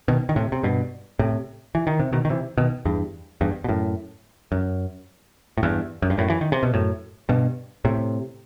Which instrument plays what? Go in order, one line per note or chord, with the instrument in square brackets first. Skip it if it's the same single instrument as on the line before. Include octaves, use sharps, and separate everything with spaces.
[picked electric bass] B2 D#3
D#3
A2 C3
C3
G2 B2
A2 C3
E3
D#3
C3
B2 D#3
D#3
C3 E3
B2 D#3
E2 G2
E2 G2
B2
F#2 A2
F#2
A2
E2 G2
F#2
G2
F#2 A2
E3
D#3
C3
B2
F#2 A2
G2 B2
A2 C3